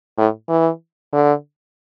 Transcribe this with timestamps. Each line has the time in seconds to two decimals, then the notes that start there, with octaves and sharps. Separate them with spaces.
0.18 A2
0.49 E3
1.13 D3